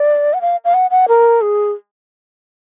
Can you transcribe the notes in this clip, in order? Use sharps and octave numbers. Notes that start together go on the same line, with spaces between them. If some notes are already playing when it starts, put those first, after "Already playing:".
Already playing: D5
F#5
F5
F5
F#5
F#5
A#4
G#4